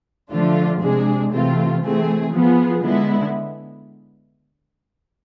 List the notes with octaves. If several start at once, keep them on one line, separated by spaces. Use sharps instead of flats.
D3 F3 A3 D4 F4
C3 G#3 D4 G#4
C3 E3 A3 C4 F4
E3 A3 C4 G#4
F3 B3 F4 G#4
D3 G#3 B3 E4